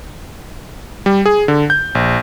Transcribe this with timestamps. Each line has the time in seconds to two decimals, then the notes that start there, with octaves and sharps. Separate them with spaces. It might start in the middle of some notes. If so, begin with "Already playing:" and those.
1.06 G3
1.26 G#4
1.48 D3
1.70 G6
1.95 A#1